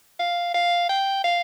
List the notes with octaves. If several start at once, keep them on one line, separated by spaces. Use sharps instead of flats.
F5
F5
G5
F5